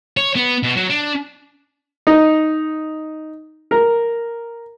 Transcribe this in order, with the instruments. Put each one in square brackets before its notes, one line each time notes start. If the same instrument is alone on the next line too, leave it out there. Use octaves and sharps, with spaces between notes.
[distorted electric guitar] C#5
B3
B2
F#3
D4
[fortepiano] D#4
A#4